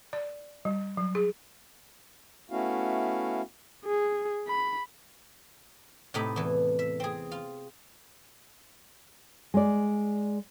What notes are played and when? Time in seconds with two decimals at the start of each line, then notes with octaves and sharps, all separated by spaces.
0.13 D5
0.65 G3
0.97 F#3
1.15 G#4
2.50 A3 B3 C#4 E4 F#4 F5
3.85 G#4
4.48 B5
6.14 A2 C3 D#4 A4 B5
6.36 E2 E3
6.79 E5
7.00 C4 G#4
7.32 F4
9.54 G#3 D5